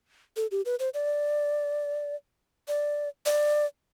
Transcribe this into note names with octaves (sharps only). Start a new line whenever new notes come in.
A4
G4
B4
C5
D5
D5
D5